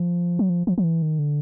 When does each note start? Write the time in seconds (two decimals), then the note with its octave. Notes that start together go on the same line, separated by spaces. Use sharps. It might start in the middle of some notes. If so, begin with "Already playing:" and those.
Already playing: F3
0.39 F#3
0.49 F3
0.67 F3
0.78 F3
0.84 E3
1.02 D#3
1.19 D3